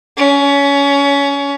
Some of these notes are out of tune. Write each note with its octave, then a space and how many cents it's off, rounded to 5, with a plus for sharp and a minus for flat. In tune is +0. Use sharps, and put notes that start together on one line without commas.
C#4 +25